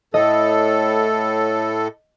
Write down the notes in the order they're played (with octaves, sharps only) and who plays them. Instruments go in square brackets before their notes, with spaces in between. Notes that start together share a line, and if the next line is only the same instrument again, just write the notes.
[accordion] A2 A4 [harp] D#5